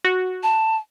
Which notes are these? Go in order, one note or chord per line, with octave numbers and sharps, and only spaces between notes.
F#4
A5